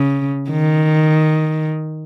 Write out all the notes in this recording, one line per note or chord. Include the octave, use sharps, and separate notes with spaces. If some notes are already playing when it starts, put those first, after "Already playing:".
Already playing: C#3
D#3